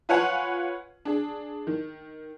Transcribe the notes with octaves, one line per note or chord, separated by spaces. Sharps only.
F4 B4 C#5 F#5 G#5
D4 G#4
D#3